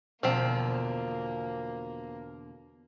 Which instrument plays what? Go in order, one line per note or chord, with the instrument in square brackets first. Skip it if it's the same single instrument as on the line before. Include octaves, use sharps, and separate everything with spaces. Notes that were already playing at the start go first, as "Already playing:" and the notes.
[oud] E2 B2 D3 [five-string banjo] F3 C4 [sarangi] A#3